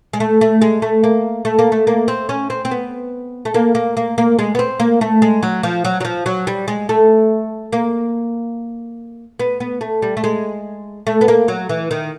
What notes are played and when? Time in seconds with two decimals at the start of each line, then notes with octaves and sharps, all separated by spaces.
0.13 G#3
0.20 A3
0.41 A3
0.62 G#3
0.82 A3
1.04 A#3
1.45 A3
1.59 A#3
1.72 A3
1.87 A#3
2.08 C4
2.29 C#4
2.50 C4
2.65 C4
2.71 B3
3.45 A3
3.54 A#3
3.75 A#3
3.97 A#3
4.18 A#3
4.39 G#3
4.55 B3
4.59 C4
4.80 A#3
5.01 A3
5.22 G#3
5.43 F#3
5.63 F3
5.85 F#3
6.00 F#3
6.05 F3
6.26 F#3
6.47 G3
6.68 G#3
6.89 A3
7.73 A#3
9.39 B3
9.60 B3
9.81 A3
10.02 G3
10.17 A3
10.24 G#3
11.07 A3
11.21 B3
11.28 A#3
11.48 F#3
11.69 E3
11.91 D#3